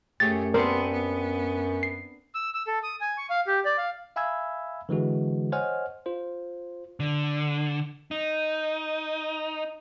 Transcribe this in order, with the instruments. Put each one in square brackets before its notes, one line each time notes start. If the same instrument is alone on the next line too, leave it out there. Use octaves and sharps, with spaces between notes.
[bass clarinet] F#2 [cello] A3 [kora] G4 G#4 C#5 [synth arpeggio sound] A6
[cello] B3 [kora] C4 D4 C5 [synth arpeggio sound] A#4
[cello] B3
[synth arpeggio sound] C7
[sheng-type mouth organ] E6
E6
A4
D#6
G#5
C#6
F5
G4
D5
F5
[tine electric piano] E5 F5 G#5 B5 E6 G#6
D3 E3 G#3 F#4
C5 C#5 D#5 F#5 G#5 F6
F4 C5
[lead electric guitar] D3
D#4